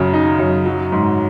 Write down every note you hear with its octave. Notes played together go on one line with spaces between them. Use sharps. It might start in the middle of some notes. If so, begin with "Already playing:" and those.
Already playing: F#2 C#3 F#3
D#4
F#2
F#3
G#2